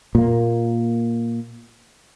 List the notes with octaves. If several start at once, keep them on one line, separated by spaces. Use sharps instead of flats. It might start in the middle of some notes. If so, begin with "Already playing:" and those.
A#2 A#3